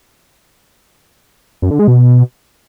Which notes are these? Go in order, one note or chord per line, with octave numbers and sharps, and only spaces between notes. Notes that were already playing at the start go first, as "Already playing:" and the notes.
F#2
D3
G#3
B2